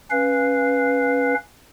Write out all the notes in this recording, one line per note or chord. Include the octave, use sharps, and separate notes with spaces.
C#4 B4 F5